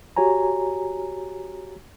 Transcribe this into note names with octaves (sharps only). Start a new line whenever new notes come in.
F#4 G4 C#5 G#5 A#5